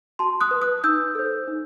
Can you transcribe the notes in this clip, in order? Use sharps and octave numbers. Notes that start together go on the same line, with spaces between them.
F#4 A5 C6
D#6 F#6
B4
D#6 F#6
D#4 E6 G6
A4 C5
D#4